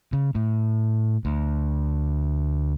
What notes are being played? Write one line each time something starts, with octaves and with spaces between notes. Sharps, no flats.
C#3
A2
D2